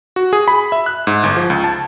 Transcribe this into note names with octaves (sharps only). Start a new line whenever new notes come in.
F#4
G#4
B5
E5
F#6
G#2
G1
F3
C#2
A5